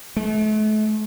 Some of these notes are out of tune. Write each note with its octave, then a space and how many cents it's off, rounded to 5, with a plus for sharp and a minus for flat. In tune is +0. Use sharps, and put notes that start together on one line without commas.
A3 -40